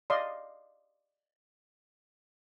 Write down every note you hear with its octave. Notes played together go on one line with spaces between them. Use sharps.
D5 D#5 F5 C6